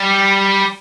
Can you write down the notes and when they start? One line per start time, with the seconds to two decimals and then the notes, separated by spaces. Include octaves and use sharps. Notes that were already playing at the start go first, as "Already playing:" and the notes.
Already playing: G3